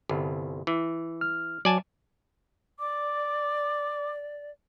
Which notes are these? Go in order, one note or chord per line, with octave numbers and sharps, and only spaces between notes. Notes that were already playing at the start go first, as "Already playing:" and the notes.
G1 C2
E3
F6
F#3 D5 G#5 A5
D5 D6